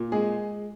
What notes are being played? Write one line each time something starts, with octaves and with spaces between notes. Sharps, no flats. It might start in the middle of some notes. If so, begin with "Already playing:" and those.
Already playing: A#2
G#3 G#4